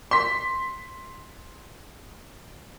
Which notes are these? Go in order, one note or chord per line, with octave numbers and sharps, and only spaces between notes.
C6 B6